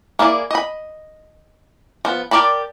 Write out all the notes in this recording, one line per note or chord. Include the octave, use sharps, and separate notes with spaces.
A#3 E4 G#4 D5
D#5 B5
F3 B3
G4 A#4 D5 A5 B5